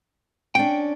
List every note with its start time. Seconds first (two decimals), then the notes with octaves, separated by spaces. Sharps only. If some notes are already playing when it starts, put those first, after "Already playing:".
0.55 C#4 D4 G5